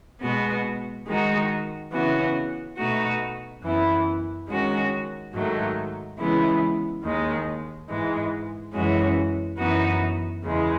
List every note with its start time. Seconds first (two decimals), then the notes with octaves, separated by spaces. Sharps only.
0.22 B2 G#3 B3 F#4
1.07 D#3 G#3 D#4 F#4
1.92 C#3 E3 B3 F#4
2.77 B2 A3 D#4 F#4
3.62 F#2 E3 B3 E4
4.48 D#3 G#3 C#4 F#4
5.33 G#2 D#3 F#3 A3 D#4
6.18 C#3 E3 G#3 B3 E4
7.03 D#2 D#3 G#3
7.88 G#2 E3 G#3
8.73 F#2 E3 G#3 C#4 F#4
9.59 F#2 E3 B3 D#4 F#4
10.44 E2 C#3 G#3